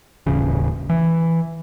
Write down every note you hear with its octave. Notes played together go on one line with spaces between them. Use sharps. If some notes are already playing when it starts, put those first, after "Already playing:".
D#1 A1 C#3
E3